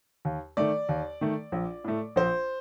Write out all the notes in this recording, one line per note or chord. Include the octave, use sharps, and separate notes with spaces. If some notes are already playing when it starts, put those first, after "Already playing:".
D#2
D#3 A3 D5
D#2
D#3 A3
A#1
A2 A3
A#1 C5